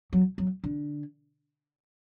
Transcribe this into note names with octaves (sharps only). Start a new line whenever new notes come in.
F#3
F#3
D3